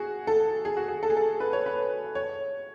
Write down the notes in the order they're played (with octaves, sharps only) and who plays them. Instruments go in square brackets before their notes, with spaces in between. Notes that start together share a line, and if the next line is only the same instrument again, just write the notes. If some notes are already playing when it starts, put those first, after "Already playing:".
Already playing: [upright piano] F#4 G#4
A4
G#4
F#4
G#4
A4
G#4
A4
B4
C#5
B4
C#5